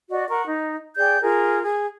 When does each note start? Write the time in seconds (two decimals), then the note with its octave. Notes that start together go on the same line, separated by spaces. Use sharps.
0.09 F#4 D5 D#5
0.29 A#4 F#5 C#6
0.45 D#4
0.96 G#4 D5 G5 G6
1.22 F4 G#4 A#4
1.64 G#4